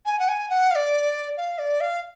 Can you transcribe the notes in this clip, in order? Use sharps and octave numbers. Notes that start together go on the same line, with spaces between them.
G#5
F#5
G#5
F#5
F5
D5
F5
D5
F5